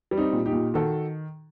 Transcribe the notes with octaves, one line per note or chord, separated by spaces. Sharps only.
G3
C4 D#4
A#2
D#4 G4
A#2
D#3 F#4 A4